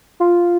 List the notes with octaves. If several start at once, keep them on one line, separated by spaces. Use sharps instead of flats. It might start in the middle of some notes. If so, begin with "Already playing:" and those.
F4